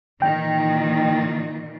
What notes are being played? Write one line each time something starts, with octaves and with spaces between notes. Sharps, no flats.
A#2 D#3 E3 G5